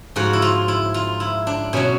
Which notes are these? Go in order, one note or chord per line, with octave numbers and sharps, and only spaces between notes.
G#2 F3 F#4
E4
F4
E4
F4
E4
D4
B2 F#3 C#4